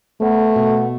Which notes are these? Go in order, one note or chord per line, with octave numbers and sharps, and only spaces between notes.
A3 B3
B2